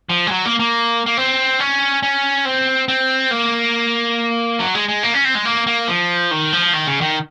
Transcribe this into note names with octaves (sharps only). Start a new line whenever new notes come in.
F3
G#3
F#3
A#3
A#3
A#3
C4
C#4
C#4
C4
C4
A#3
F#3
G#3
G#3
A#3
C#4
C4
G#3
A#3
A#3
F3
D#3
F3
D#3
C#3
D#3